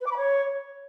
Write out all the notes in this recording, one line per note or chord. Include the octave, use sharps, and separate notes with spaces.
B4
D6
B5
C#5